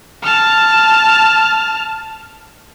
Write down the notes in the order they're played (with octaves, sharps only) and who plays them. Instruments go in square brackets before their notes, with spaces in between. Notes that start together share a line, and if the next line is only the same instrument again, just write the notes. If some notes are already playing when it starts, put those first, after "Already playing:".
[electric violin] A5 F6